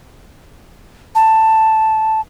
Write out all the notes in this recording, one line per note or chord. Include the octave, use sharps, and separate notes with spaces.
A5